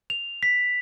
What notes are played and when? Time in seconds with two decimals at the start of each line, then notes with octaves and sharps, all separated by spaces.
0.10 F7
0.43 B6